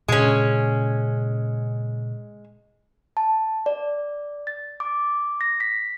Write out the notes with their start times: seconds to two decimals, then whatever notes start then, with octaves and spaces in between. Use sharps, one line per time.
0.08 A#2 C#3 G#3 C#4
3.17 A5
3.66 D5
4.47 A6
4.80 D6
5.41 A#6
5.60 B6